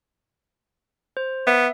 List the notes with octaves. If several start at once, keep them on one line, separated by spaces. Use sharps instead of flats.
C5
B3 E5